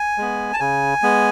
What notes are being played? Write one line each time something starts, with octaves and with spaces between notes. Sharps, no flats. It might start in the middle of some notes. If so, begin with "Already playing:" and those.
Already playing: G#5
G#3 B3
A5
C#3 G#5
G#3 B3